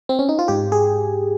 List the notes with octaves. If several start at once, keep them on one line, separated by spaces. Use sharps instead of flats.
C4
C#4
D#4
F4
G#2 G4
G#4